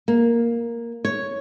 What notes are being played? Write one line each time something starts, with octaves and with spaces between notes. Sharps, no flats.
A#3
C#5